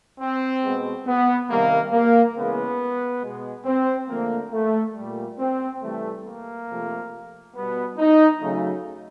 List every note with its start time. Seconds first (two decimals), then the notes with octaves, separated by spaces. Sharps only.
0.20 C4
0.64 B2 G#3
1.07 B3
1.50 C3 D#3 G3 A#3
1.93 A#3
2.36 C#3 E3 G#3 B3
3.22 B2 G#3
3.65 C4
4.08 D3 F3 A3 A#3
4.52 A3
4.95 G3
5.00 A#2
5.39 C4
5.82 C3 E3 G3 A3
6.25 A#3
6.68 C3 F3 A3
7.55 B2 G3 B3
7.98 D#4
8.41 C#3 F#3 A3